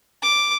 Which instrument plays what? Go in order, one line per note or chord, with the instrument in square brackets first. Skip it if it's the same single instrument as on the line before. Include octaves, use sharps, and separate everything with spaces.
[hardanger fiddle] D6